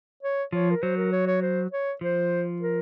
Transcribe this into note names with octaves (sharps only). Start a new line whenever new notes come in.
C#5
F3 C#5
A#4
F#3 C5
A#4
C#5
C#5
C5
C#5
F3 C5
A#4